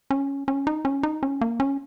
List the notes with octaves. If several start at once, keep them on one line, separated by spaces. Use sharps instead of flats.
C#4
C#4
D#4
C#4
D#4
C#4
A#3
C#4